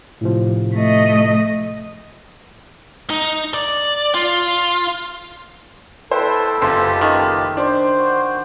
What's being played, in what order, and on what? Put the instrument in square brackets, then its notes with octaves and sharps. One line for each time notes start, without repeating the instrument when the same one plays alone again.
[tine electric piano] A2 C3 F3
[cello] A3 D#5
[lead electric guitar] D#4
D5
F4
[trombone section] B2 A4 [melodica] E4 B4 G5 [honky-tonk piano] C5
[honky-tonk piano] F#1 C6 [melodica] F4 G4 A5
[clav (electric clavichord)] D#3
[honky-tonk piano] D4 [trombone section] C5
[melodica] F#4